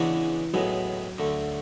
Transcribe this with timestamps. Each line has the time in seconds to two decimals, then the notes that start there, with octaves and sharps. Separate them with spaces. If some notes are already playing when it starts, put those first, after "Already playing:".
Already playing: E2 C#3 E3 G#3 D4 F#4
0.53 A2 F#3 G#3 B3
1.18 D2 D3 A3